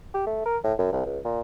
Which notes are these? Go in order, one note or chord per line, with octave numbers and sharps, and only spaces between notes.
G4
A3
A#4
A2
F#2
C2
C#2
A#2